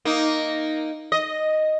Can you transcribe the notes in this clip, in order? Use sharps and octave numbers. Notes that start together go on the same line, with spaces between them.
A#3 D#4
D#5